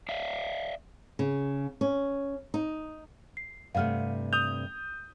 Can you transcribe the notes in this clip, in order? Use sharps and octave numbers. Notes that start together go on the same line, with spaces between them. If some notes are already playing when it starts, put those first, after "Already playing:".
D5 E5 F5
C#3
C#4
D#4
C7
G2 C3 A3 F5 F#5 F6
D#6 G6 F7